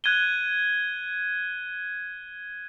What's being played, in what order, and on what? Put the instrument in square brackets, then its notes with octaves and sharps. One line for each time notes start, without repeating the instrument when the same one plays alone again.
[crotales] F#6 G#6 D#7 G7